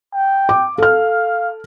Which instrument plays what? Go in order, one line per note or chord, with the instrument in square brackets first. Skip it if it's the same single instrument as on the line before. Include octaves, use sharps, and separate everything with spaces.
[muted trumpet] G5
[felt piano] D6
[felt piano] A4 F6 [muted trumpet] F5